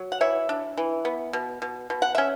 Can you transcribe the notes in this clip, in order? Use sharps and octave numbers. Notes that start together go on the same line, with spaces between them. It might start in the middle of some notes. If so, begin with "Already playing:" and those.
Already playing: F#3
F#5
E3 C#5 E5
D4
E3
B3
B2
B2
B2
F#5
C#4 E5